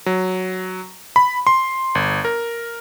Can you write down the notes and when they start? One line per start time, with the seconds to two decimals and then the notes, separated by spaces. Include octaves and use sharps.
0.06 F#3
1.16 B5
1.47 C6
1.95 G1
2.25 A#4